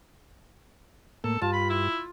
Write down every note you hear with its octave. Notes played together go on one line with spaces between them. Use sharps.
A2 A#3 A4
G2 F4 A5
B5
E4